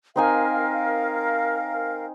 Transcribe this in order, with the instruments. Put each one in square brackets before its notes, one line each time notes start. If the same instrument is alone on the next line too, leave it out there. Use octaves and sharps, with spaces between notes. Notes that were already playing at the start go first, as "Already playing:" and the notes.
[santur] C4 D#4 G#5 [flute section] A#4 F5